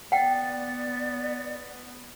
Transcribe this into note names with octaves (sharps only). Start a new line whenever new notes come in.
B3 D5 F#5 G5